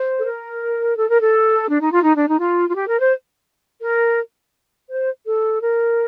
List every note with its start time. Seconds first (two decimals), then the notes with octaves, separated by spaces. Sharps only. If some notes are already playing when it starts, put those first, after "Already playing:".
Already playing: C5
0.18 A4
0.24 A#4
0.96 A4
1.08 A#4
1.20 A4
1.68 D4
1.80 D#4
1.91 F4
2.03 D#4
2.15 D4
2.27 D#4
2.39 F4
2.70 F4
2.75 G4
2.86 A#4
2.99 C5
3.82 A#4
4.90 C5
5.25 A4
5.61 A#4